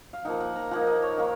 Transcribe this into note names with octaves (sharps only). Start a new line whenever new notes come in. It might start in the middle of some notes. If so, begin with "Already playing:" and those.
F5
F3 A#3 D#4 F#5
F#5
A#5
F3 A#3 D#4 F#5
D#5
C#5
D#3 A#3